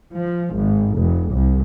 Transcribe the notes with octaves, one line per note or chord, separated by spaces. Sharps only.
F3
G#1
F1
C2